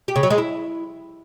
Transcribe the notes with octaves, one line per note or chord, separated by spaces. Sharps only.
G4
C#3
F#3
G#3
E4